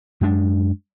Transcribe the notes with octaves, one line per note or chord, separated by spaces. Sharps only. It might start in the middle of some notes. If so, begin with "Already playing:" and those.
F#2 G#3 D4